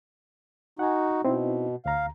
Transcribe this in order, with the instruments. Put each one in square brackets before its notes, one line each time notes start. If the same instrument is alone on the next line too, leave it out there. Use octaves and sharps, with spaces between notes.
[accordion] D#4 F#4 [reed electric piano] F#5 G#5
[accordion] B2 [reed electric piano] C4 D#4 E4
[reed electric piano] D2 A#5 [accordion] F5